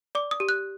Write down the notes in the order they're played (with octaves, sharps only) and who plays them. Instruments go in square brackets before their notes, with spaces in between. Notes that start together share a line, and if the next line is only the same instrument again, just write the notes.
[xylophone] D5 D6
D#6
G4
F#6